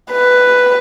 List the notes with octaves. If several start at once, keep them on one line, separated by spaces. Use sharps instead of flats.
B4